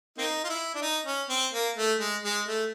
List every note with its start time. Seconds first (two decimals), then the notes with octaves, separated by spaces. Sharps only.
0.18 A#3 C4 D#4
0.44 F4
0.49 E4
0.75 D4
0.82 D#4
1.06 C#4
1.29 C4
1.53 A#3
1.76 A3
2.00 G#3
2.25 G#3
2.48 A3